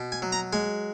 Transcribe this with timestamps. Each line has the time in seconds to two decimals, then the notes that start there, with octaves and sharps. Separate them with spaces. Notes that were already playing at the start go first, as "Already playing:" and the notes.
Already playing: B2
0.12 G#5
0.22 F#3
0.32 A#5
0.53 G#3 G#5